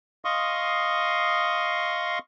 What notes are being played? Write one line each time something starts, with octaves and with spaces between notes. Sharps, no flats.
D#5 F5 C6 C#6 D#6